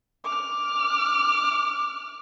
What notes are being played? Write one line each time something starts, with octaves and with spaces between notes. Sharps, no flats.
D6 F6